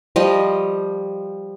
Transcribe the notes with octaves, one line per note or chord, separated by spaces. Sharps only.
F3 G3 D#5